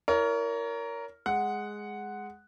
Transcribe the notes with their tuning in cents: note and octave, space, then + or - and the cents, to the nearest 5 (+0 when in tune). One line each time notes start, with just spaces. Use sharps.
E4 -10 A#4 +0 C#5 +35
G#3 +0 F#5 +0